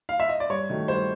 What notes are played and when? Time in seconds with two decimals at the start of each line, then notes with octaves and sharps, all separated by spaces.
0.09 F5
0.20 E5
0.29 D#5
0.40 D5
0.50 G2 C#5
0.69 D#3 F#3 A3
0.88 G2 C5